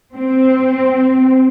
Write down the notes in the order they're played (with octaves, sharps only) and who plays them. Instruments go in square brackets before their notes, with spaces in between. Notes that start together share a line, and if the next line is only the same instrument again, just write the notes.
[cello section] C4